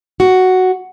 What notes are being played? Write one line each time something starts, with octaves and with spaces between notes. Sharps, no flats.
F#4